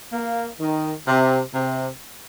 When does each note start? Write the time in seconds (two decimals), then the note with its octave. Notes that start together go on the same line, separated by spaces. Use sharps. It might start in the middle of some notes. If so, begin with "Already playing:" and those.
0.13 A#3
0.60 D#3
1.07 C3
1.54 C3